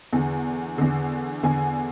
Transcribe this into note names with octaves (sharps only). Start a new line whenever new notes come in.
E2 D3
E2 D3
E2 D3 G#5